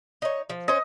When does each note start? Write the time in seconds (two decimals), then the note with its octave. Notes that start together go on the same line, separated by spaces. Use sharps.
0.22 D#4 C#5
0.50 F3
0.68 C#4 C5 D#5